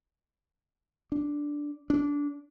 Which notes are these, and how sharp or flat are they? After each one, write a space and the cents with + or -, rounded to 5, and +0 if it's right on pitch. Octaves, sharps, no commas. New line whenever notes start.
D4 -5
D4 -20